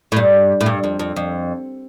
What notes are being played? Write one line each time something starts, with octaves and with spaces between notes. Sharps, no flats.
A2
G2
A2
G2
F2
F2
F2